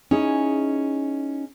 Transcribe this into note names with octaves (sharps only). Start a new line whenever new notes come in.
C#4 D#4 E4 G#4